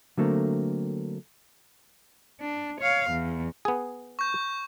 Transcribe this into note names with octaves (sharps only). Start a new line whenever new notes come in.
D3 F#3 A3 A#3 C4
D4
C#5 F5
E2
B3 G#4
C#6 G6